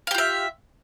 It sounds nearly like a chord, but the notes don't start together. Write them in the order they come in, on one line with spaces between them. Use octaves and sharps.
F5 G4 F4 E5